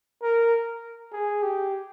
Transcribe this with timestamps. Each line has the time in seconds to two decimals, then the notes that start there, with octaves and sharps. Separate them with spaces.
0.22 A#4
1.12 G#4
1.43 G4